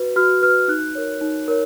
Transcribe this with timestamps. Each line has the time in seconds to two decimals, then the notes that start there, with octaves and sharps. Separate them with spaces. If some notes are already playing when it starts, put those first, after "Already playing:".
Already playing: F#4 B4
0.16 F#4 F6
0.42 B4 F6
0.68 D#4 F#6
0.95 A#4 C#5
1.21 D#4
1.48 A#4 C#5